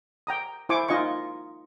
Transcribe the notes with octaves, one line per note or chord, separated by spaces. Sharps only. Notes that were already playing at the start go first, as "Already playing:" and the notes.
G5 A#5 D#6
E4 C5 E5 G#5 C#6 D6
D#4 F4 D#5 G#5 C#6